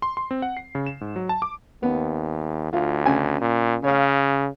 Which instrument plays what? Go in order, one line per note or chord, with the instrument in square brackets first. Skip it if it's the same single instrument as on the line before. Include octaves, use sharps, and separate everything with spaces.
[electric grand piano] C6
C6
C4
F#5
C7
C#3
E7
G#2
F#3
A5
D6
[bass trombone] D#2 [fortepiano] B3
[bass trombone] D2 [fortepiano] F4
[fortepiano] C#3 G#5
[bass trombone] A#2
[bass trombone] C#3 [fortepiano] C#5 F5